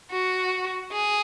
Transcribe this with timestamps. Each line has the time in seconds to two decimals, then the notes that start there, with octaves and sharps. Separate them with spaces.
0.11 F#4
0.92 G#4